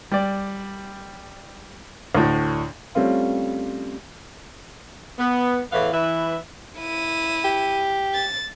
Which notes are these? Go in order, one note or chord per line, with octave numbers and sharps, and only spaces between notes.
G3 D5
D2 A2
G3 A3 C4 C#4 F4
B3
E2 A2 E3 B3 E5 F5
E3 B4 E5
E4 D#7
G4
A6